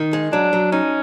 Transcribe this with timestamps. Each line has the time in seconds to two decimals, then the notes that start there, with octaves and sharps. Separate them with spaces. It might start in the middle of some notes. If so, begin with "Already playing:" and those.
Already playing: D#3
0.13 G#3
0.32 F#3 D4
0.53 F#3
0.72 C#4 D#4